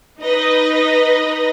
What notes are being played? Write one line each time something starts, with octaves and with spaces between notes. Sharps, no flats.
D#4 B4 D#5